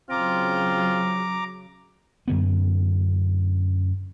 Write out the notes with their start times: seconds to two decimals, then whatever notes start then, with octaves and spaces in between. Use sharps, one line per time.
0.10 C#3 F#3 C4 F4 A#5 D6
2.28 F#2 D3 B3